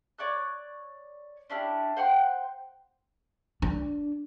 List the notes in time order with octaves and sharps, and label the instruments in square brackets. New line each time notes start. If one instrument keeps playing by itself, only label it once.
[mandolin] C#5 D5 C#6 F#6
C#4 D4 E4 G4
C5 F#5 G5 C6
[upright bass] D4